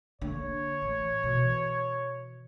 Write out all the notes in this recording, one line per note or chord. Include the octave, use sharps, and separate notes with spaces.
D3 A#3 C#5
A1
B2 E3